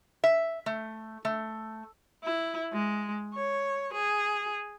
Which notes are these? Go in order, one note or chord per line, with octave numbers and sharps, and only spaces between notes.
E5
A3
A3
E4
G#3
C#5
G#4